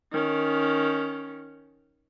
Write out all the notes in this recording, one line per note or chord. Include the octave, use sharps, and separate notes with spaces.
D#3 C#4